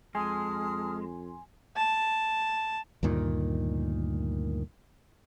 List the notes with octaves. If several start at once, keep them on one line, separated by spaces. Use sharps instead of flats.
F2 G#3 G#5 A5 C6 D#6 F6
A5
D2 G2 A#2 D#3